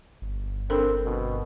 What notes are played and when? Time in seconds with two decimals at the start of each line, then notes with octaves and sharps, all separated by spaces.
0.22 G1
0.70 C4 D4 A4 A#4
1.04 B2